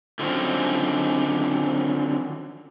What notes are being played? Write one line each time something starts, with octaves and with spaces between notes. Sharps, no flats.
D3 D#3 F3 F#3 C4 C#4